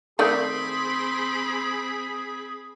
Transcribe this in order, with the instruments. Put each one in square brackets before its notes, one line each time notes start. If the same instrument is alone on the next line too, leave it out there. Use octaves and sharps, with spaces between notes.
[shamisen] D#3 A3 D5 [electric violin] C4 B5 [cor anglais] G#4 [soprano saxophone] C6